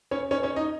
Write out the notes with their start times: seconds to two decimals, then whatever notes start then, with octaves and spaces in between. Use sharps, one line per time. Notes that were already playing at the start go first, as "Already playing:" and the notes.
0.11 C#4 C#5
0.31 C#4 C#5
0.43 C#4 C#5
0.56 D#4 D#5